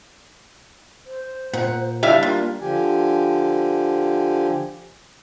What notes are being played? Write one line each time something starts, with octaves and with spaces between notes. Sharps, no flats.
C5
A#2 F#5
G3 D4 E4 G4 E5 F5
A#3 F4
D3 F3 G4 G#5